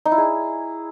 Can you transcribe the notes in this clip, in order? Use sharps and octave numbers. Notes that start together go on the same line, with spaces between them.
D#4
E4
G#4